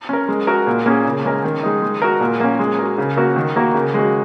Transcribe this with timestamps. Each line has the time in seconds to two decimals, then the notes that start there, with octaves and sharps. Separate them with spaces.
0.09 C#4 A#4
0.28 G#3
0.47 F#4 A#4
0.67 A#2
0.86 A#3 C#4 G#4
1.05 C#3
1.25 G#3 C#4 A#4
1.44 D#3
1.63 G#3 D#4
1.82 G#3
2.02 F#4 A#4
2.21 A#2
2.40 A#3 C#4
2.59 G#3
2.78 F#4 A#4
2.98 C#3
3.17 A#3 F#4 A#4
3.36 D#3
3.56 A#3 F#4 A#4
3.74 C#3
3.94 G#3 F#4